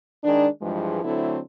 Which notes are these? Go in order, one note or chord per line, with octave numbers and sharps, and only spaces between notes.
D#3 G#3 D4
G2 E3 F3 G#3
D3 F#3 A3 C4 E4